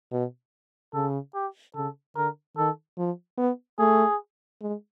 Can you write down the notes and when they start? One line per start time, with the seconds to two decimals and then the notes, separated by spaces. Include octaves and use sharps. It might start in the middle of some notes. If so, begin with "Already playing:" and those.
0.12 B2
0.94 C#3 A4
1.34 G4
1.75 C#3 A4
2.16 D3 A#4
2.57 D#3 A4
2.98 F3
3.38 B3
3.79 A3 G#4
4.61 G#3